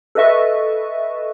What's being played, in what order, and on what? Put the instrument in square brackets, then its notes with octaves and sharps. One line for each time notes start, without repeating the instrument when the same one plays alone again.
[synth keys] A4 B4 D#5 E5 C#6